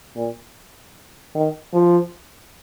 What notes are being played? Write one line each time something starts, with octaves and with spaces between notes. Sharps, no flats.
A#2
D#3
F3